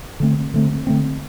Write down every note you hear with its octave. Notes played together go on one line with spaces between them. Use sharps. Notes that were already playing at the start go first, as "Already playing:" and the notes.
D3 A3 C4
D3 A3 C4
D3 A3 C4